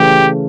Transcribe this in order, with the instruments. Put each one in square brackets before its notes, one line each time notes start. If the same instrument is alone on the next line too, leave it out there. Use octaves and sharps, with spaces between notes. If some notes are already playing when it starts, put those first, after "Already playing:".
Already playing: [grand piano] C#3 E3 A3 C#4 [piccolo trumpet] G4